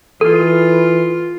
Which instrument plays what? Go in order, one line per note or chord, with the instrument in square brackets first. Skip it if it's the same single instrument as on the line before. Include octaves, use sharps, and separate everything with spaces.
[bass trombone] E3 [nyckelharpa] F4 [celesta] A4